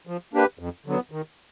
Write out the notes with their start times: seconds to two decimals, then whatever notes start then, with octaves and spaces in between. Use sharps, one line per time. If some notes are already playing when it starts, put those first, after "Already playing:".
0.07 F3
0.34 A#3 D4 G4 B4
0.59 F2
0.86 D3 F#3 B3
1.12 D#3